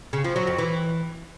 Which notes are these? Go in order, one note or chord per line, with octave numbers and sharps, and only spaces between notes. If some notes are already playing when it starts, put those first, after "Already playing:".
C#3
F3
F#3
F2
E3